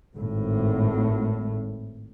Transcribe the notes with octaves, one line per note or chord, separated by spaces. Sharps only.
G#1 A2